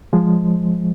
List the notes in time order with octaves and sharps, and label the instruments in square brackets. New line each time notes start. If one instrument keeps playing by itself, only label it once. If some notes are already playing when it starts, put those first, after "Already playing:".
[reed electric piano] F3 G#3